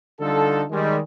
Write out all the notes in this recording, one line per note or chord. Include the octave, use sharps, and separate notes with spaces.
D3 G3 D#4 F4 A4
D#3 G3 G#3